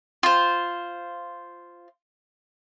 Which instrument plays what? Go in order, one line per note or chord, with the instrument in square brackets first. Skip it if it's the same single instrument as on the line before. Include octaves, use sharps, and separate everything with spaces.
[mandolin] F4 C5